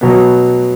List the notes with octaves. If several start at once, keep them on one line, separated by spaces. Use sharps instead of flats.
B2 F#3 B3